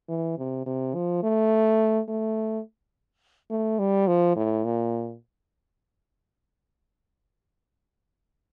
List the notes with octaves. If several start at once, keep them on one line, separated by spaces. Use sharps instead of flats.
E3
C3
C3
F3
A3
A3
A3
G3
F3
A2
A#2